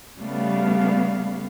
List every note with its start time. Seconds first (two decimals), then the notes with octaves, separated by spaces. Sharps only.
0.20 C#3 G3 A3 B3 F5